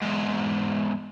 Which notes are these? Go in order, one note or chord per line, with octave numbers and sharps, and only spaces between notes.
E2 G#2